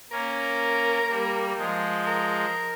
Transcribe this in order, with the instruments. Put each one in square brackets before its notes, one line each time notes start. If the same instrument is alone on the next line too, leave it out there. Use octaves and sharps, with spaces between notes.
[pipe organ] A#3 C#4 [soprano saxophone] A#4
[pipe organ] G3 A#3
F3 G#3
[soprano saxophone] A#4